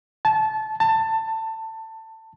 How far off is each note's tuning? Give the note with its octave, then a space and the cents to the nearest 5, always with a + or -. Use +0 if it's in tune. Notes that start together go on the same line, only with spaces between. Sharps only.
A5 -20
A5 +20